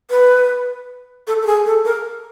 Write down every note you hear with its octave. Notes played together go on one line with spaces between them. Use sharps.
B4
A4
A4
G#4
A4
A#4